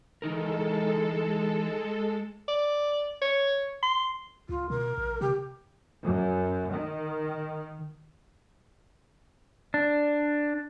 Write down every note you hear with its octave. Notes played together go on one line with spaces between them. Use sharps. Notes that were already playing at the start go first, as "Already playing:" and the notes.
E3 G#3 D#4 A4 A#4
D5
C#5
C6
C#2 F4
B2 A#4
A#1
C3 G4
F#2
D#3
D4